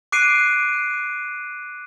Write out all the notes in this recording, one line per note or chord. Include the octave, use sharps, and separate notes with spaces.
D6 F#6 C7 D7 D#7